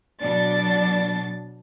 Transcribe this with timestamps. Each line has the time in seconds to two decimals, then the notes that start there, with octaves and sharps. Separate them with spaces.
0.21 B2 F#3 D4 D5 A6